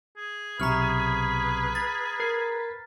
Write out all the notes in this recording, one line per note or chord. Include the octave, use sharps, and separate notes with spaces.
G#4
B1 C3 B4 A#5 C#6 F6
A6
A#4 G#6 C7